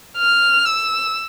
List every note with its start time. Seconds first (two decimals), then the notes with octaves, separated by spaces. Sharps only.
0.18 F6
0.65 E6